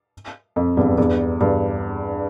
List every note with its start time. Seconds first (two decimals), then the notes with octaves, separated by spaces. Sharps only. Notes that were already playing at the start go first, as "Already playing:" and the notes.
0.56 F2
0.77 E2 G2
0.98 E2 G2
1.40 E2 G2